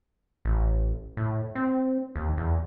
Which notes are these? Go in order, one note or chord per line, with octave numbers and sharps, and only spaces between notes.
A1
A2
C4
D#2
E2